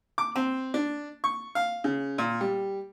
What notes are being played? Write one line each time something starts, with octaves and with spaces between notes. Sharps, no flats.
D6
C4
D4
C#6
F5
C#3
A#2
G3